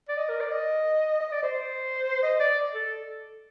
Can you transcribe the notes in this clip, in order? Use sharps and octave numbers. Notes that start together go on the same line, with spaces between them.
D5
D#5
A#4
D5
D#5
D#5
D5
C5
D#5
D5
A4